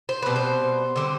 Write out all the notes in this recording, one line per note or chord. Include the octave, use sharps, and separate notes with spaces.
C5
B2 G3 C4 B4
C5
D3 G3 C4